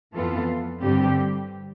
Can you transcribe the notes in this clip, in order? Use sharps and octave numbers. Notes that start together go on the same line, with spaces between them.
F2 E3 B3 F4 A4
G2 D3 G3 C4 G4